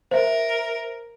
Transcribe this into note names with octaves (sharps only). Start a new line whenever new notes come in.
A#4 C5 E5